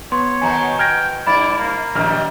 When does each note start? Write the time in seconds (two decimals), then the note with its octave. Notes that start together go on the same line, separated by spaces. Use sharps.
0.12 B3 C#5 C6
0.41 B2 D#3 F#3 G#5 A#5
0.79 G5 F6 G#6 A#6
1.27 G2 E4 D5 B5
1.58 A#3
1.95 A#1 F#2 D#3 G3 F6